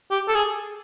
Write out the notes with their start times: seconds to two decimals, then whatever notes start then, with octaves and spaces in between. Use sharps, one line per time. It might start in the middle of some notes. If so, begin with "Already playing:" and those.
0.11 G4
0.28 A4
0.35 G#4